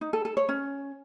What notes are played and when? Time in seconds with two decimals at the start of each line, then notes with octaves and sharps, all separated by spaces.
0.01 D#4
0.13 A4
0.25 A4
0.37 C#5
0.49 C#4